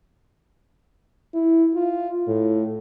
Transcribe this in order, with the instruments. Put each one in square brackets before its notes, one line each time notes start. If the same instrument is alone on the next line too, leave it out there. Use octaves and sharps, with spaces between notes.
[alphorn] E4
F4
A2